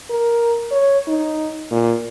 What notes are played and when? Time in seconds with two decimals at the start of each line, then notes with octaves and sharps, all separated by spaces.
0.10 A#4
0.71 C#5
1.08 D#4
1.71 A#2